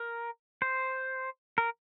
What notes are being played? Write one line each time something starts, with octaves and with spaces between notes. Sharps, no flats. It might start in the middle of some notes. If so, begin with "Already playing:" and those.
Already playing: A#4
C5
A#4